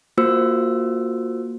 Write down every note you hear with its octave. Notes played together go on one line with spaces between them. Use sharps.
A#3 F4 F#4 C5 E6